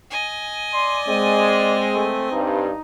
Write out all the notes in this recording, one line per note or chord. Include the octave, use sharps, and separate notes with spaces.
D#5 G#5
D5 C6
G#3 C4
A3
G2 D#4